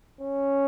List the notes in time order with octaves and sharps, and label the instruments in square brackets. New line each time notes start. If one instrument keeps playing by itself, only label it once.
[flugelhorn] C#4